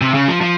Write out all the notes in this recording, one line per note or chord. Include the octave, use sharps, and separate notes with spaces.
C3
C#3
F3
F3